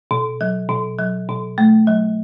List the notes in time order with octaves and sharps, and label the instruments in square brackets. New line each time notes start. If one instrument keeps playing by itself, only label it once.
[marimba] B2
F#3
B2
F#3
B2
A3
F#3